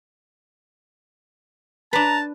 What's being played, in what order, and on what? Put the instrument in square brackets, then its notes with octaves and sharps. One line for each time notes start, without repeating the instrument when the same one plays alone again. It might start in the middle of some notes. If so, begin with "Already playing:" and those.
[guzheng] D4 B4 [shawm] A5 [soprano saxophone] A#5